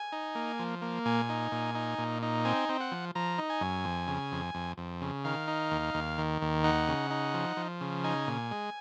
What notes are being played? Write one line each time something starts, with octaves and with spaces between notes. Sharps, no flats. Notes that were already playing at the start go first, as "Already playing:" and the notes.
Already playing: G#5
D#4
A#3
F3
A#3
A#2 G#5
D#4
A#2
D#4
A#2
D#4
C4 G#5
C4
F#5
F3
F3 A#5
D#4
G#5
F#2
F2
C#3
F2
F2
F2
C#3
D#3 F5
D#4
D#2
D#2
D#3
D#2
D#4 F#5
C#3
D#4
F3
F3
C#3
D#4 G#5
A#2
G#3